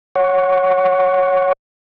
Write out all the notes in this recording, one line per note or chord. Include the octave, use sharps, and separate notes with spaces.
C#5 F#5 C#6